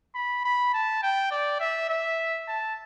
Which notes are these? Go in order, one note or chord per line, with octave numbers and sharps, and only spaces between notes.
B5
B5
A5
G5
D5
E5
E5
A5